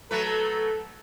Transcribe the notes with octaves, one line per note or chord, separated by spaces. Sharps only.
F#3 A3 A4 B4